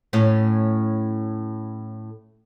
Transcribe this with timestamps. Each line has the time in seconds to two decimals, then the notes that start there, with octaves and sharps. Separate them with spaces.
0.13 A2 C#4